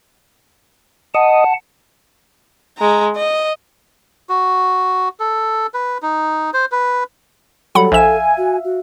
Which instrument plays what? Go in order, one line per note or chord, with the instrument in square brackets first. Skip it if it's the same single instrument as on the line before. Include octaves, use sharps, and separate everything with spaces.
[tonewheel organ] D#5 [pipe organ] F#5 A5
[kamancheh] G#3 A#5
D#5
[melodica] F#4
A4
B4
D#4
C5
B4
[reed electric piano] F#3 G3 [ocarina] A4 [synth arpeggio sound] F#5 B5
[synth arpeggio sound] A#1 E7 [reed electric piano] E5 F5 [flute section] G#5
[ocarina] F#4
F#4